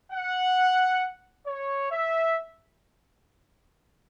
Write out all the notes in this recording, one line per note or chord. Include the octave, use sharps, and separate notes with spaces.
F#5
C#5
E5